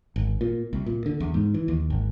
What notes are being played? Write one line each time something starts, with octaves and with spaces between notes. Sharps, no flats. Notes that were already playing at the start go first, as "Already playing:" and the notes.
G#1
A#2
C2
A#2
D3
E2
G#2
E3
D#2
G#1